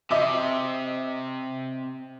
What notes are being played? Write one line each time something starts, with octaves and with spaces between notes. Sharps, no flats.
C3 D#5 E5 D6